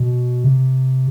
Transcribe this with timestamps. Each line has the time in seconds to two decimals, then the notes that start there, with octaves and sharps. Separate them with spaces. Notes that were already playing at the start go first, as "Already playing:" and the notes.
Already playing: B2
0.44 C3